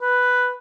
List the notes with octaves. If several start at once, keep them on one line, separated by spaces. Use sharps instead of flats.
B4